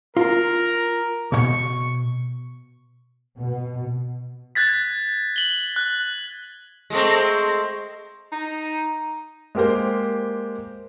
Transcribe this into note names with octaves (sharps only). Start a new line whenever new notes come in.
F4 A#4 A#5
C#2 B2 C#6
B2
F#6 G#6 A6 B6
F#7 G7
F#6
G#3 A3 C4
D#4
G#3 A#3 G4 A#4 C5